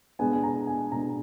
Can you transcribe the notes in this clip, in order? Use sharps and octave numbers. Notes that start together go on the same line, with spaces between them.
B2 G#3 B3 D4 G#5
G#5
A#5
G#5
B2 G#3 B3 D4 A#5